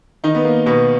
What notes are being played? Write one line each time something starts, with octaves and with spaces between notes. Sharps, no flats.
D#3 D#4
B3
A#3
B2 B3